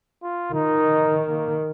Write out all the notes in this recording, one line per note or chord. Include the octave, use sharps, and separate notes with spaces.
F4
D#3 D#4
A#3